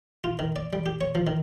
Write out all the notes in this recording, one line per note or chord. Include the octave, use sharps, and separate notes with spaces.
F4
D#3
D5
G3
G4
C#5
F3
D#3